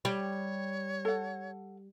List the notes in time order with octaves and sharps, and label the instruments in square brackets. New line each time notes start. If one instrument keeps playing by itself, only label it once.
[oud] G3 [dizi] C#5
[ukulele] A4 F#5